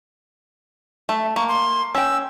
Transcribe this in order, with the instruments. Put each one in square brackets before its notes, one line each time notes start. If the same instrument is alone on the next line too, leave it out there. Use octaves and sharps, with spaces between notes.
[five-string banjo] A3 [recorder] E5
[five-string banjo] A#3 [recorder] C#6
[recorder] C6
[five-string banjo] C#4 G5 [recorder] E6